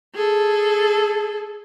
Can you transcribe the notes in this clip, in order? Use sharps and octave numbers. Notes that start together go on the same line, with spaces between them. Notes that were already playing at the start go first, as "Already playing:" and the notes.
G#4 A4